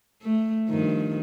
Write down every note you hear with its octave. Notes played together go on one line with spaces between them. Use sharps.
A3
G2 D#3 F3